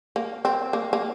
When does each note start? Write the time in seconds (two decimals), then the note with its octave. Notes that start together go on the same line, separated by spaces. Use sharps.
0.16 A#3
0.45 C4
0.73 A#3
0.93 A#3